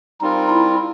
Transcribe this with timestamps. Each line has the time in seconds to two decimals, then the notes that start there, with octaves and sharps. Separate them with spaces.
0.21 G3 C4 D#4 F4 A#4
0.50 E4